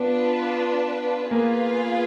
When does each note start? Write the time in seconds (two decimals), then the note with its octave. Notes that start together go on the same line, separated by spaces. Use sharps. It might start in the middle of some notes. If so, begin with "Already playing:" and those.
Already playing: B3 D4 F4 B4
1.31 A#3 F4 G#4 B4 F5